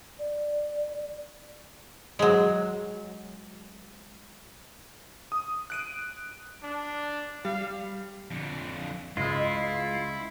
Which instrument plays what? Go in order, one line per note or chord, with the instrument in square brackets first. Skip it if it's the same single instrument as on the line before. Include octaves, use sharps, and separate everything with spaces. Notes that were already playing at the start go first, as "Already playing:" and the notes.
[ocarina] D5
[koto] F#3 G#3
[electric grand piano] D#6
F#6 D7 D#7
[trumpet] D4
[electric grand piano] G3 [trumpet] F5
[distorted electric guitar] F2 D3
[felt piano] C#2 D#5 [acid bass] G#3 [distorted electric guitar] E4 [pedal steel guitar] F4